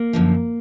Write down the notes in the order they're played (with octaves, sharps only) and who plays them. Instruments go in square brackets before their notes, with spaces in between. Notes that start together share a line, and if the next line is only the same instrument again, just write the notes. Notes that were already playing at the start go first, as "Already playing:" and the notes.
Already playing: [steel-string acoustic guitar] A#3
F#2 D3 F3